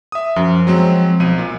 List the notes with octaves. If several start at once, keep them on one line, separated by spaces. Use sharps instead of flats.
E5 D#6
F#2 F3
F#3 G#3 C4
B1 D#7
A#2